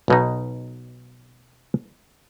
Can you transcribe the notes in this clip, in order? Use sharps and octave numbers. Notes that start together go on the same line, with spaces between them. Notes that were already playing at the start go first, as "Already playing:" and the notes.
B1 B2 D#4